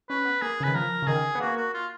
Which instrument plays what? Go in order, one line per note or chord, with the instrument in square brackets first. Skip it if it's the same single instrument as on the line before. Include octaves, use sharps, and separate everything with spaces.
[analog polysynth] C#4 [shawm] B4
[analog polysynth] B3
[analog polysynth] A#3 [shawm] G#4
[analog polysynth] C#3
[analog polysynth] D#3 [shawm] B4
[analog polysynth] F3 [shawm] A#4
[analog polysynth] C#3
[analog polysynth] D#3 [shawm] G#4
[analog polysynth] B3
[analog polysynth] A#3 [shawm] F#4
[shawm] F#4
F4